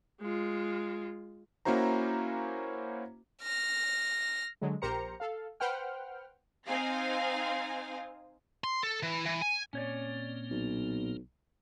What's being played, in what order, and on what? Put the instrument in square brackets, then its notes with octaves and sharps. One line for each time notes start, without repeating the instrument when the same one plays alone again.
[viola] G#3 F4
[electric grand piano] A#3 C#4 E4 F#4 C5 A#5
[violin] F6 A#6
[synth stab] D3 F#3 G#3
A#1 G4 A#4 C5 A#5 C#7
A4 F5
B4 C5 F#5 G5 F6
[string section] C4 D#4 C5 F5 G#5 A#6
[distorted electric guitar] C6
A4
E3
E3
G#5
[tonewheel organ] A#2 A#3 C4 [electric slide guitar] C#4 C#5 D5
[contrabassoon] B1